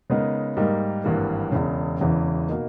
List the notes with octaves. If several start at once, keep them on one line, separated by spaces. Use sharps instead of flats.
C#3 G#3 B3 D#4 A#4
G#2 G3 A#3 D#4 A#4
G#1 G2 E3 G3 A#3
E1 E2 C#3
E1 E2 C#3 E3
B2 A#3 D#4